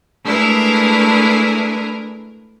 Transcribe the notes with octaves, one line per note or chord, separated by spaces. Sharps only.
G#3 A3 D4 E4 A#4 B4